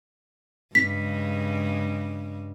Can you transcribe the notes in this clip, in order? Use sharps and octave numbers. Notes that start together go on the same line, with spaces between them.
G2 C#3 G#3 B6